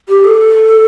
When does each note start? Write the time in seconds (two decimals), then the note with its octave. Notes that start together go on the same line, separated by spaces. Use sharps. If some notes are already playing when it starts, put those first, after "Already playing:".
0.08 G4
0.24 A4